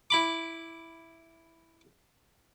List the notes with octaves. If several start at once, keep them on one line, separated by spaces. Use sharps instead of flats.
E4 B5 D6